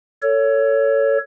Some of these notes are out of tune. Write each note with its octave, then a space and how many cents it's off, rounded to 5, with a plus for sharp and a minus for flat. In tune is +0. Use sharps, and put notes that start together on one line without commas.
A4 +25 C#5 +15